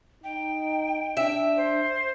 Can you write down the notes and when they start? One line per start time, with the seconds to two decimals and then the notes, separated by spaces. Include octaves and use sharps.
0.24 D#4 G5
1.17 D4 E5
1.56 C5